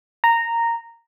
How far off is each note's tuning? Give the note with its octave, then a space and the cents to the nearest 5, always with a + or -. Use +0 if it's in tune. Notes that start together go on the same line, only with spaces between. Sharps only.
A#5 -10